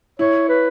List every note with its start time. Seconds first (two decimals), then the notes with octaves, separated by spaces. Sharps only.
0.19 E4 C#5
0.49 B4